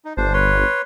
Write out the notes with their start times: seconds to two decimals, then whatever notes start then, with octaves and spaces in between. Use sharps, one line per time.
0.05 D#4
0.17 G1 D4 C5
0.34 B4 C#5 C6